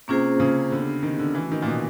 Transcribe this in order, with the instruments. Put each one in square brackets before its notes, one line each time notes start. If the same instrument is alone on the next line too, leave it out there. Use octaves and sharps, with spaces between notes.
[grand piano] C3 [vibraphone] A#3 C#4 F4 G#4 C5
[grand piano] C#3
[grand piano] D3 [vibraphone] B3 D4 G4
[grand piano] D#3
D3
[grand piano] E3 [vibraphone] A3 C#4 F#4
[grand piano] D#3
A#2
B2